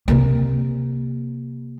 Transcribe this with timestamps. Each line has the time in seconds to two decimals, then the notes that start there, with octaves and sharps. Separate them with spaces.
0.08 C3 A#3